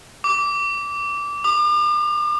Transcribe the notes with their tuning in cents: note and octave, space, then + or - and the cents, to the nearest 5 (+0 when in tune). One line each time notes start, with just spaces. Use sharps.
D6 -15
D6 +45